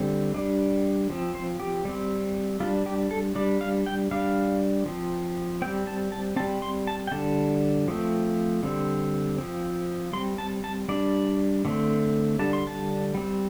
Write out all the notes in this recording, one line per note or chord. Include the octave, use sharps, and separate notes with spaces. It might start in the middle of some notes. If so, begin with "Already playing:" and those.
Already playing: D3 G3 C4
G3 D4
F3 C4
C5
G4
G3 C4
G3 D4 F4
G4
A4
G3 D4 D5
F5
G5
G3 D4 F5
F3 C4
G3 C4 G5
A5
A5
G3 C4 A5
C6
A5
G5
D3 G3 D4 A5
F3 A3 C4
D3 G3 C4
F3 C4
G3 C4 C6
A5
A5
G3 D4 D5
D3 A3 C4
D3 G3 D4 A5
C6
A5
G3 C4